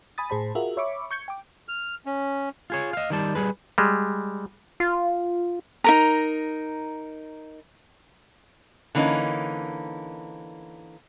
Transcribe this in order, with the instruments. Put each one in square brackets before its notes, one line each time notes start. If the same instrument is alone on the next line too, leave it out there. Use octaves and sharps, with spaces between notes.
[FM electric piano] G#5 B5 D#6 A6
A2 G#4 C5 A5 B5
F4 F#4 G#4 A#4 E5
C#5 E5 B5 C#6 D6
C#6 G6 G#6 C#7
G5 D6
[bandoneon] F6
C#4
[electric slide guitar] F4 G#4 C#5
D#5 F5
D#3 G3 A5
G3 G#4 B4
[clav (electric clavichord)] G3 G#3
[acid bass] F4
[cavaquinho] D#4 A#4 A#5
[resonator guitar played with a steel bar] D3 E3 A#3 C#4 D#4